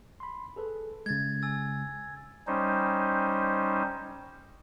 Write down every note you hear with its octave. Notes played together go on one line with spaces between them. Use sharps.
B5 C6
G#4 A4 B4
C#3 G#3 G#6 A6
G#5 E6 A6
G3 C#4 D#4 C5